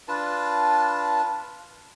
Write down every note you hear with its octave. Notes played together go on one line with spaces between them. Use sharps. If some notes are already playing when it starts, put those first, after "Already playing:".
D4 F4 B4 A5